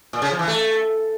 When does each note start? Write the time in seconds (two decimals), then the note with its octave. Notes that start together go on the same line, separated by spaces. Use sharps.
0.13 A#2
0.22 C#3
0.30 F3
0.39 E3
0.48 A3